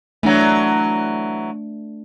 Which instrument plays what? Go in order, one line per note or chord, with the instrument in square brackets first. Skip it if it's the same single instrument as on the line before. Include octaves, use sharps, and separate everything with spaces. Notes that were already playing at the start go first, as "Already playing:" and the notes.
[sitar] E3 F#3 [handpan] A3 D4